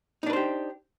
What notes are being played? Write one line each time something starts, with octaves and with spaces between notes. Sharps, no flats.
D4 D#4 G4 B4 C5